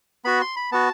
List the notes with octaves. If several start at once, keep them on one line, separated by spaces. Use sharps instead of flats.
B3 F#4 B5
C6
B5
B3 F#4 A5